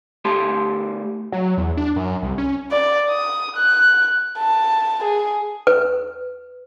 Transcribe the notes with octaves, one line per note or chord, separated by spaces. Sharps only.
D2 A3 G4 C6
F#3
E2
D4
F#2
C2
C#4
D5
D#6
F#6
A5
G#4
B4